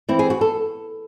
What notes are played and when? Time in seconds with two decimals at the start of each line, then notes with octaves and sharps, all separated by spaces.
0.09 E3 C4 E4
0.19 G#4
0.30 F#4
0.41 A4